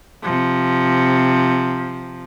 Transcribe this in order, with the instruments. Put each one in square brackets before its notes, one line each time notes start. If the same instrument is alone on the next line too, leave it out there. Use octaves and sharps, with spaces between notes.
[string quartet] C3 F3